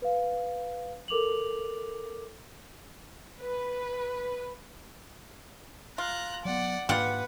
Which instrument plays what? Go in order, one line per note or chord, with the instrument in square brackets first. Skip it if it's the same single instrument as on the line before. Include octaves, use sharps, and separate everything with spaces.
[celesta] B4 F5
A4 A#4 D6 F7 F#7
[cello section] B4
[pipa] F4 [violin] A#5 F#6
[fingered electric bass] F#3 B3 [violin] D5 F#5
[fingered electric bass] G#2 A#3 D4 [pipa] F4 G4 [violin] B4 [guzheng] F#5